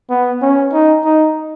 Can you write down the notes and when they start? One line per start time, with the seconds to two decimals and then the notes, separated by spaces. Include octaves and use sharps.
0.10 B3
0.42 C#4
0.73 D#4
1.05 D#4